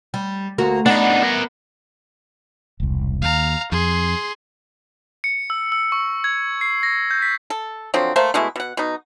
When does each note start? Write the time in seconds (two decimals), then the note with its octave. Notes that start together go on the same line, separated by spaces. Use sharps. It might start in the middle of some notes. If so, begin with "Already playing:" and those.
0.14 G3
0.58 D2 A#3 F#4
0.86 B3 D4 D#4
1.23 A#4 F#5
2.80 E1 C2
3.22 D#2 F5 A#5
3.72 F2 G#4 C6
5.24 C#7
5.50 E6
5.72 E6
5.92 C#6
6.24 G#6
6.61 C7
6.83 A#6
7.11 G6
7.22 B6
7.50 A4
7.94 D3 F3 F#3 C4
8.16 A3 A#3 C5
8.34 B2 G#3 A3 E4
8.56 B2 F#5
8.77 B2 D#4